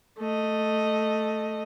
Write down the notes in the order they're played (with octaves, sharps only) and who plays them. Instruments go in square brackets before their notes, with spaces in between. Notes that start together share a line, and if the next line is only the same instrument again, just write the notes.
[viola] A3 D#5